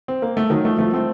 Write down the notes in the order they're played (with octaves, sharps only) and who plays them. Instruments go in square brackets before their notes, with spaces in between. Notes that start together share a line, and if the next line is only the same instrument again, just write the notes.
[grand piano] C4
A#3
A3
D#3 F#3
F3 A3
F3 A3
A3 C4